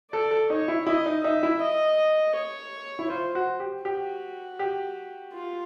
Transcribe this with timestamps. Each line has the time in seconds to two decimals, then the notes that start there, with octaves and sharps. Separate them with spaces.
0.12 A4 D5
0.31 A4
0.50 D#4 C#5
0.68 E4
0.87 E4 D#5
1.06 D#4
1.24 D#4 E5
1.43 E4
1.61 D#5
2.35 C#5
2.99 E4
3.10 F4 C5
3.35 F#4
3.60 G4
3.85 F#4 G4
4.59 G4
5.33 F4